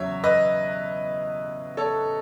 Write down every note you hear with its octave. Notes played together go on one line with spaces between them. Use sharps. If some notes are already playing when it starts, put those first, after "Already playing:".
Already playing: E2 C#3 F#3 C#5 E5
B4 D#5
A4 C#5